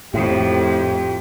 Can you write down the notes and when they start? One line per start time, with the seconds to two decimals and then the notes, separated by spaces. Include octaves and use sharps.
0.14 F2 A2 F3 G4